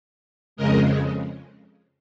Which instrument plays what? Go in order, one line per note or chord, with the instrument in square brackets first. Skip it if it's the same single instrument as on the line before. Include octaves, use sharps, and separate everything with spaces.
[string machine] F2 C#3 G#3 A#4 D#5